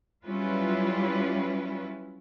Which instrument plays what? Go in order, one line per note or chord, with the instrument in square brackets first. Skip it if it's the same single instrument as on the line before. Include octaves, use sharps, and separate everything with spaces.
[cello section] F#3 G3 C#4 E4 F4 B4